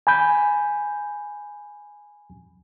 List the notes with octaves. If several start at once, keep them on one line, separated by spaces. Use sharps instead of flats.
G#5 B5 G6